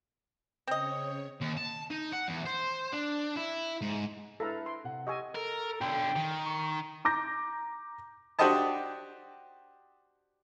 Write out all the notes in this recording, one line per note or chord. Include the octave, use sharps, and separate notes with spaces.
C#3 C4 C#5 D#5
D#2
A5
D#4
F#5
E2
C5
D4
E4
G#2
E4 A4 B4 F5 A#5
C6
C3 F#5
G4 D#5 G#5 C#6 E6
A4 A#4
B1 D3 G5
D#3
C#6
A#5 D6 G6 A#6
D4 F#4 G4 C5 D#5 A5